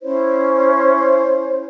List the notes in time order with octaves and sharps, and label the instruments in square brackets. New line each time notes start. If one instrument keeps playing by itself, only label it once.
[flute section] C#4 E4 C5 C#5